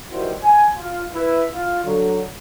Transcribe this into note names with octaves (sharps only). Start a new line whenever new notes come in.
D#3 E3 G3 E4 F#4 C5
G#5
F4
E4 B4
F4
D3 F#3